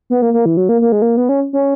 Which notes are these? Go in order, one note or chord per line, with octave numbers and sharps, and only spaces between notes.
B3
A#3
A#3
E3
F#3
A#3
A#3
G#3
A#3
B3
C#4
C#4